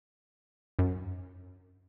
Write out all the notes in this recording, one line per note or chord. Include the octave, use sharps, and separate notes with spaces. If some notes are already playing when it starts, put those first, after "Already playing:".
F#2